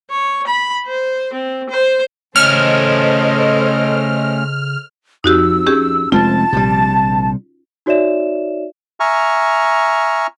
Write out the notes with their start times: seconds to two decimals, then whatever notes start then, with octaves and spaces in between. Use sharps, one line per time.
0.10 C#5
0.47 B5
0.86 C5
1.33 C4
1.70 C5
2.36 C#3 A3 C#4 A4 C5 D#5 F6
5.24 F2 D#4 F#4 G4 E6
5.66 C#4 G4 G#4
6.12 F1 G#3 C4 F4 A5
6.52 A#1 C3 G3
7.86 D#4 F#4 C#5 D5 E5 E7
9.00 E5 G#5 A#5 C#6 F6